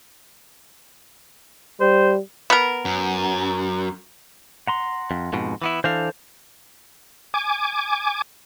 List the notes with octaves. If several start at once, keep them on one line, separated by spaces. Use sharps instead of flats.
G3 C5
B3 A#4
F#2
F#5 A#5 C6
F2
F2 G#2 B2
E3 B3 E4
E3 D4 A4 C5 F5
G#5 D6